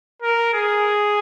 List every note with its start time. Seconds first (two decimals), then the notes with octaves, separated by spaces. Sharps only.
0.22 A#4
0.54 G#4